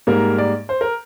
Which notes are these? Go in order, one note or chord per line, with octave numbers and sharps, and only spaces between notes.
G#2 G3 A#3 A#4
D5
C5
A#4